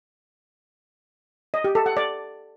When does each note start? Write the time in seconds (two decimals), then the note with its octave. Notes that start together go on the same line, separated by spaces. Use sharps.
1.54 D#5
1.64 G4
1.75 A4
1.86 F#5
1.97 D5